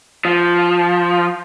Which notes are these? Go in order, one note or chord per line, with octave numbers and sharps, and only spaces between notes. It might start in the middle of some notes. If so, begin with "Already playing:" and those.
F3